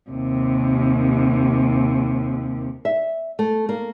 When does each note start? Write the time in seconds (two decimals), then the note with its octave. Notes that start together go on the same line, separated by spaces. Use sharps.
0.10 D#2 C3
2.85 E5
3.39 A3
3.69 A#3